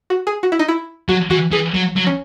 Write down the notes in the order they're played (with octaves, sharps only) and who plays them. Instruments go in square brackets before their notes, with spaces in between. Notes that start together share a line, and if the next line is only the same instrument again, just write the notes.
[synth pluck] F#4
G#4
F#4
E4
D#4
E4
[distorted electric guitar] F#3 [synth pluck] F#4
[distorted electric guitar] E3 [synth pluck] F#4
[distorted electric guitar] E3 [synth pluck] G#4
[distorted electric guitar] F#3
F#3
[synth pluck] C#4